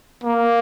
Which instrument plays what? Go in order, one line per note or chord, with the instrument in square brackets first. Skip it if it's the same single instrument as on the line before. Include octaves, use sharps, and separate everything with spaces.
[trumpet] A#3